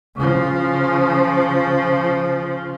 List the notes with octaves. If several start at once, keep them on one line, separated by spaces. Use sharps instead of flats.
C#3 F3